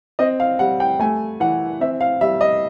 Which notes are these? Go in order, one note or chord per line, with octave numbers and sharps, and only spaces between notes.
C4 D#5
F5
G3 F#5
G5
A3 G#5
E3 F#5
C4 E5
F5
G3 E5
D#5